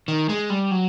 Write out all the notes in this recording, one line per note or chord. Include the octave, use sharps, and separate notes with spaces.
D#3
G#3
G3
F#3